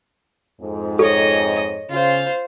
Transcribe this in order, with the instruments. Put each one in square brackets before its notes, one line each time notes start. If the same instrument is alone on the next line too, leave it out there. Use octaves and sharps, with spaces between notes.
[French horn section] F2 G#2
[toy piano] A4 [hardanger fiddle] C#5 D#5
[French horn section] C#3 [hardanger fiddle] F4 C5